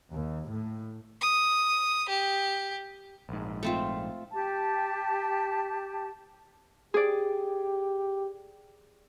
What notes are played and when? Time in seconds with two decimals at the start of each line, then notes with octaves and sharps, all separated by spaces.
0.12 D#2
0.49 A2
1.21 D#6
2.09 G4
3.29 A#1 G#2
3.63 A3 C4 F4
4.33 G4 A5
6.94 G4 G#4 D5